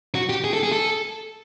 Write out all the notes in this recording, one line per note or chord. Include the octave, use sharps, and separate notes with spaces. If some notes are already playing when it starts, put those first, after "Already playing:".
F#4
G4
G#4
A4
G#4
A4